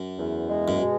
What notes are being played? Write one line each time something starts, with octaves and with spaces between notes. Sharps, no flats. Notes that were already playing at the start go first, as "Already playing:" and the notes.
Already playing: F#2
E2
G#3
F#2
B2